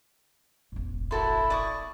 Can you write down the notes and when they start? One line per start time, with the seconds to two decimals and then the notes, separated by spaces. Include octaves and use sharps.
0.72 E1 A1
1.11 E4 F#4 A4 C6
1.50 D5 C#6 D#6